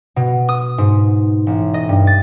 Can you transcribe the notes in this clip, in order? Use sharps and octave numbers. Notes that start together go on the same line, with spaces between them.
B2
D#6
G#2
A1
D#5
G2
A6